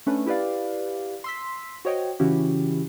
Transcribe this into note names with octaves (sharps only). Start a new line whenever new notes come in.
A3 C#4 D4 B4
E4 G4 B4 D5 F5
C6 E6 B6
F#4 C5 C#5 D#5 G5
C#3 E3 C#4 E4 F#4 G4